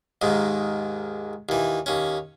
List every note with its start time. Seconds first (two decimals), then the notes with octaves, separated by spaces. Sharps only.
0.22 D#2 G#2 D#3
1.49 D#2 E3
1.86 D#2 C#4